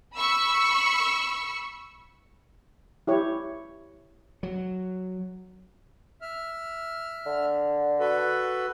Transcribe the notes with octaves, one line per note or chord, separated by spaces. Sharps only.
B5 C#6 E6
E4 G4 C#5
F#3
E5 F6
D3
F#4 A4 B4